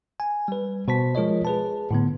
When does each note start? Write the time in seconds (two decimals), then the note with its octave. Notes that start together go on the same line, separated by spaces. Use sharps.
0.20 G#5
0.48 G3 B4
0.88 B2 C5 A5 B6
1.15 F3 G#3 F4 A#4 C#5 D#5
1.45 G#4 B4 A5
1.91 A2 D3 B3